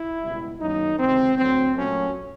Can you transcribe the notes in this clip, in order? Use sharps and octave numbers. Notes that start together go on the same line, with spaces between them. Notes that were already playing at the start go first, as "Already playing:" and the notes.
Already playing: E4
C#2 B2 G3
F#2 D#3 F#3 A#3 D#4
C#2 C3 D#3 C4
D2 D3 F#3 C4
A#2 F#3 A3 C#4